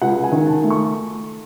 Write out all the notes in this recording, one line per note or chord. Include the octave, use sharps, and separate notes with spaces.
C#2 F#5
G#5
D#3
A5
A3
C#6